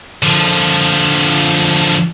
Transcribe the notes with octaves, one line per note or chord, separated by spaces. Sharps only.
D3 F3